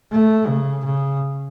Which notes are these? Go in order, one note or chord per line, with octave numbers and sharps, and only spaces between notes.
A3
C#3
C#3